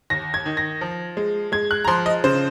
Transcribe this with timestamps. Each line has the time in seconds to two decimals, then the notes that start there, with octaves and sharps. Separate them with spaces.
0.10 D#2 A#6
0.34 G#6
0.46 D#3
0.57 A#6
0.81 F3
1.17 G#3
1.52 G#3 G#6
1.71 F#6
1.84 A#5
1.88 F3 C6
2.06 D#5
2.24 C#3 C5